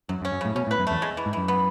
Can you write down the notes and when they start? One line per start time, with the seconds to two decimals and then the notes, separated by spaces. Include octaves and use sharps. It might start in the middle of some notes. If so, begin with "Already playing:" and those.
0.09 F#2 F#3
0.22 F#2
0.25 C#4
0.32 F#2
0.41 A2 C#3
0.55 B2 C#4
0.67 A2
0.71 B4
0.79 F#2
0.87 E2 A3
1.02 G#3
1.17 E3
1.26 G#2
1.33 F#2 E3
1.48 B3